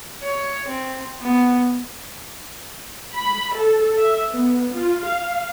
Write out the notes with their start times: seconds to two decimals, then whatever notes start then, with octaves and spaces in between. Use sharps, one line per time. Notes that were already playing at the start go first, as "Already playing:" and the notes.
0.23 C#5
0.67 C4
1.21 B3
3.14 B5
3.55 A4
3.98 E5
4.30 B3
4.74 F4
5.05 F5